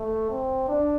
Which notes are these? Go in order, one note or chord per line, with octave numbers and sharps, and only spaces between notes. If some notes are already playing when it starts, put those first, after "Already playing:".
Already playing: A3
C4
D4